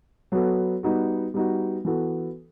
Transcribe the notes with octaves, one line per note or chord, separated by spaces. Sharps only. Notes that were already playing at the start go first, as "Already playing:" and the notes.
F#3 B3 F#4 A4
G3 B3 D#4 F#4
G3 B3 D#4 F#4
E3 B3 F#4 A4